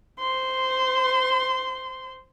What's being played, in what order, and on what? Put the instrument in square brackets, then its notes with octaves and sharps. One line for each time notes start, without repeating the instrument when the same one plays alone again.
[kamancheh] C5 C6